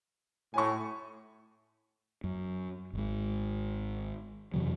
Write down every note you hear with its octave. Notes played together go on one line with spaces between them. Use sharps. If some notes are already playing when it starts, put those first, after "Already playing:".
A2 G#5 C#6
F#2
G#1 G#2
F2 C3 E3 F#3